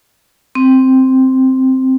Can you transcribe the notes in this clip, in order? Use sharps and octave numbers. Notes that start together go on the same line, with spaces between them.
C4